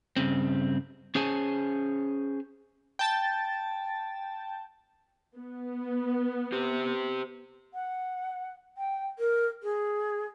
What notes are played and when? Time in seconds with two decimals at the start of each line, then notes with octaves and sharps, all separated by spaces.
0.16 G2 A#2 C#3 C4
1.15 C#4 G#4 C5 C#5 G#5 A5
2.99 G5 A5 A6
5.36 B3
6.52 G4 C5
7.74 F#5
8.77 G5
9.19 A#4
9.63 G#4